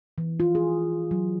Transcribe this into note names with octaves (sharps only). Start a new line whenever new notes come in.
E3
F4
G#4
F#3